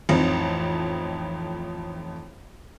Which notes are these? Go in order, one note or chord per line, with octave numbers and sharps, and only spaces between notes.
A1 F2 C4 D#4